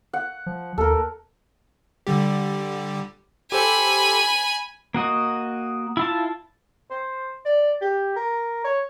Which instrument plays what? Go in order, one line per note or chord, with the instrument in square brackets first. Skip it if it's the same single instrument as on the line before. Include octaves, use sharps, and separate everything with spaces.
[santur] F#5
[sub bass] F3
[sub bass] D#2 [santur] A4 A#4
[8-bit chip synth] D3 G3 G4
[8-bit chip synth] G4 A4 C5 [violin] G#5 B5
[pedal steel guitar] A#3 F#4 D#5
E4 F4 A5
[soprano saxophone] C5
D5
G4
A#4
C#5